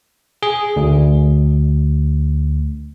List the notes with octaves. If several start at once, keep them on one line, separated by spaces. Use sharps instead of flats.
G#4
D2